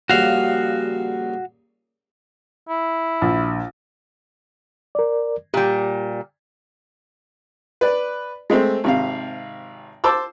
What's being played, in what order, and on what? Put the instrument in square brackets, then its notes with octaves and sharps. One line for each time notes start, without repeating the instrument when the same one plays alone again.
[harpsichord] A#1 C#3 G3 [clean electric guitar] F#4 F5
[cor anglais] E4
[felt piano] A#1
[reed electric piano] A#4 D5
[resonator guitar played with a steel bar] A#2 G3 [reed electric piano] G4
[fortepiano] B4 D5
G#3 A3 C4
G#1 C3 F5
C5 A5 D6 E6